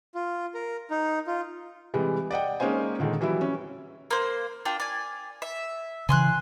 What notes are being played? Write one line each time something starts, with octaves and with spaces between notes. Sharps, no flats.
F4
A#4
D#4
F4
C3 E3 G3 G#3
D5 D#5 F#5 G5
G#3 A#3 C#4 D#4 C5 G#5
A#2 D3 D#3 G#3
E3 F#3 G3 E4
C#4
A#3 C5
D4 F4 G5
D5 G#5
E5
C#3 E3 G#5 C6 F#6